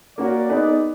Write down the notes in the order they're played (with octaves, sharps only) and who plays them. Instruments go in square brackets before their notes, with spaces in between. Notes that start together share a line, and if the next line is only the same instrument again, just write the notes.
[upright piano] A#3 C#4 F#4 A#4 [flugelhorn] D5
[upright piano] B3 D#4 G#4 B4